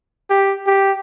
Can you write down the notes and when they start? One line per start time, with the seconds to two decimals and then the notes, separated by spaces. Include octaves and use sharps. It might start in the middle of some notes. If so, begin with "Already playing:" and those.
0.30 G4
0.67 G4